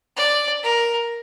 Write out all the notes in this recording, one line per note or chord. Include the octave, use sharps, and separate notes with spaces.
D5
A#4